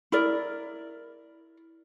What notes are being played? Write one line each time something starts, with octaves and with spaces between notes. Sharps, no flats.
E4 A#4 D5